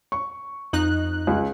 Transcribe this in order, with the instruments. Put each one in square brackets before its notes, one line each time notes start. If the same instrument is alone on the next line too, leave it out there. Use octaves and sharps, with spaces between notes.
[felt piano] C#6
[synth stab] F2 D#4 F#6
[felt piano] C#2